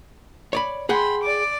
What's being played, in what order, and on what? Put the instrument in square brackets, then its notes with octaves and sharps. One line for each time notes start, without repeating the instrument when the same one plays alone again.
[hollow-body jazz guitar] C#5 D5 B5
[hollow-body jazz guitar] G#4 F#5 G5 [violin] B5 C6
[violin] D5 D6